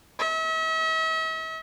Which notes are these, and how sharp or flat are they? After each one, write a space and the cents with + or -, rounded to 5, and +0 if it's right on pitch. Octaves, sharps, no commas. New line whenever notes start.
E5 -45